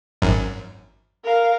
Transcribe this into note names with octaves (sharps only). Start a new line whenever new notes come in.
G#1 F#2
A#4 F5